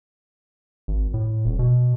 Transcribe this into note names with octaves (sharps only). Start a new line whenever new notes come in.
G#1
A2
D#1
B2